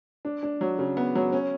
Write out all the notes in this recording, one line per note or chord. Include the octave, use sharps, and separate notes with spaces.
D4
D4
F#3
C#3
B3
F#3
C#4